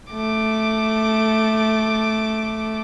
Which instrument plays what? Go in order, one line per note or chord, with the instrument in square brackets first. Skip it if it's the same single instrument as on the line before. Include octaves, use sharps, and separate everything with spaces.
[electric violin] A3 D6